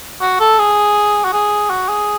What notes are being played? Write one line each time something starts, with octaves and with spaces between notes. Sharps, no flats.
F#4
A4
G#4
F#4
G#4
F#4
G#4